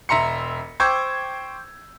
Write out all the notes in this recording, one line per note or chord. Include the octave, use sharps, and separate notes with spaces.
E1 E5 A#5 C6 C#7
C5 G5 C#6 D6 E6 G#6